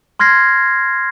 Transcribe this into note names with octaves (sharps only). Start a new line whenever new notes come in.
C6 F6 G#6 A#6 C7